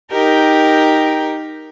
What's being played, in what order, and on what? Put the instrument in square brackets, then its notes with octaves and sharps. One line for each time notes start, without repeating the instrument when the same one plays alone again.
[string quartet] D#4 G4 A#4 G5